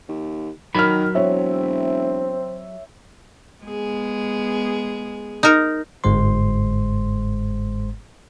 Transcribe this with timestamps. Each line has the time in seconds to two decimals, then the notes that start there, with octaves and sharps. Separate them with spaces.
0.09 D#2
0.75 D#3 F#3 A#4 B5 F6
1.15 E1 C4 C#5 E5
3.64 G#3 B3 G#4
5.43 D#4 A#4
6.04 G1 G#2 G#3 C5 C6